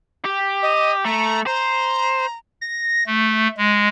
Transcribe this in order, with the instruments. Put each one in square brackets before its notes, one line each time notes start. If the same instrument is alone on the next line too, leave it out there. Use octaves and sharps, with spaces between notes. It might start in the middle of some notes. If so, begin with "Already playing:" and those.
[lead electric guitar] G4
[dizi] D#5
[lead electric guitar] A3 [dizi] A#5
[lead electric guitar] C5 [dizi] A#5
[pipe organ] A#6
A3
G#3